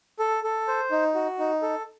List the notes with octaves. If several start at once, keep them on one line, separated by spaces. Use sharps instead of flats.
A4
A4
C5
D#4
F#4
D#4
A4